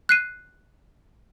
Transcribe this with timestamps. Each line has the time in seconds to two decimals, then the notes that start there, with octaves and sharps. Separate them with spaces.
0.09 F#6 C7 D#7